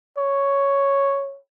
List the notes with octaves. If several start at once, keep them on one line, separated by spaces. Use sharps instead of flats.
C#5